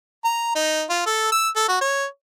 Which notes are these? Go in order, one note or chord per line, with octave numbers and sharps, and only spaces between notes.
A#5
D#4
F4
A4
E6
A4
F#4
C#5